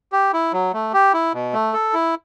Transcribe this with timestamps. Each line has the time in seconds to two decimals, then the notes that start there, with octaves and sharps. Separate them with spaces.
0.12 G4
0.33 E4
0.53 F#3
0.73 A3
0.93 G4
1.13 E4
1.33 B2
1.53 A3
1.73 A4
1.93 E4